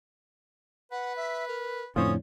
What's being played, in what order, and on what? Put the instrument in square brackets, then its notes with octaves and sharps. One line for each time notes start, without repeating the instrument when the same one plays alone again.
[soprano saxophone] B4 [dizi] F#5
[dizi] E5
A#4
[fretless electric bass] F2 A2 D3 [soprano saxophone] C#4 [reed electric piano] F4 C5 C#5 [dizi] D#6